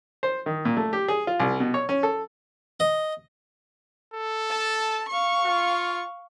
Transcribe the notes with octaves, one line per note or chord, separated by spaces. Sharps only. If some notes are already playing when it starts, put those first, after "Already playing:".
C5
D#3
A#2
A3
G4
G#4
F4
C2
B2
C#5
C#4
A4
D#5
A4
A5
F5 C#6
F4